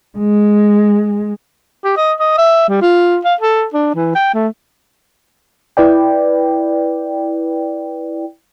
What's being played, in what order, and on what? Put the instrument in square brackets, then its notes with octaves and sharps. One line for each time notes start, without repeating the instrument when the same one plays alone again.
[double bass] G#3
[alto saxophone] G4
D#5
D#5
E5
G3
F4
F5
A4
D4
E3
G5
A3
[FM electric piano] E4 B4 D5 G5